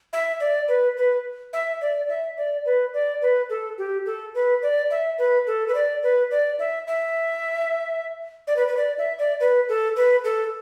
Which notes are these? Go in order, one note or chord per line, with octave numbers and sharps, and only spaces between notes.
E5
D5
B4
B4
E5
D5
E5
D5
B4
D5
B4
A4
G4
A4
B4
D5
E5
B4
A4
B4
D5
B4
D5
E5
E5
D5
B4
B4
D5
E5
D5
B4
A4
B4
A4